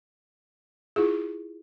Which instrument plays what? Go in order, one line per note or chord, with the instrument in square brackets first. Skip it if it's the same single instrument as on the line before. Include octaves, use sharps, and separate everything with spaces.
[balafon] E4 F4 G#4